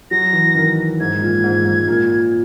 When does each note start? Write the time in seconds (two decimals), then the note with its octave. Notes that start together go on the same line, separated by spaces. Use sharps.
0.11 F#3 A#6
0.33 E3
0.55 D#3
1.00 G#2 G#6
1.21 A#2
1.44 G#2
1.65 G#2
1.87 A#2